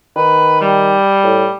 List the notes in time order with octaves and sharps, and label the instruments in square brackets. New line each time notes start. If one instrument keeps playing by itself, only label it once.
[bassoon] D#3 [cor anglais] B4
[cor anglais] G3
[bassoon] A2